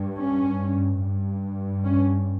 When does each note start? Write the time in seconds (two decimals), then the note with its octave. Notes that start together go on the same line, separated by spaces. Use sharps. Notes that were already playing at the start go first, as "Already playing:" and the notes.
Already playing: G2
0.17 C#4
1.01 G2
1.85 C#4